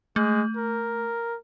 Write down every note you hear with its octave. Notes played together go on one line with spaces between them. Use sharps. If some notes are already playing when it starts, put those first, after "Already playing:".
G#3 A3
A#4